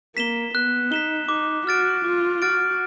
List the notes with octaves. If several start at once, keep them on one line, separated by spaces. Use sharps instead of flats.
A#3 B6 E7 G7
B3 F#6
D#4 B6 E7 G7
D#4 D6
F#4 F6 A6 D7
F4 D6
F#4 F6 A6 D7